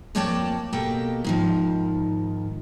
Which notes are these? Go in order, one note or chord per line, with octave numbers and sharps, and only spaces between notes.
F2 A#3 C#5 D5 G5 A5
B2 A#3 G4 A4 G5
G#2 D#3 F3